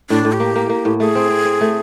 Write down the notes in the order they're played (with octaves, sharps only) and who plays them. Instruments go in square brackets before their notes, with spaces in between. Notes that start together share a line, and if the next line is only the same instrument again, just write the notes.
[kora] A2 [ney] D4
[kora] A2
[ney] G4
[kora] A#3
A#3
A#3
A2
[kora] A3 [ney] G#4
[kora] C4
C4
C4
A3